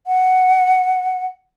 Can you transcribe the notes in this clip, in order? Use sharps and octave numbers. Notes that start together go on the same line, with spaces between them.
F#5